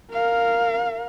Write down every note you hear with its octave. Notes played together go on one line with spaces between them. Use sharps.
A#4 F5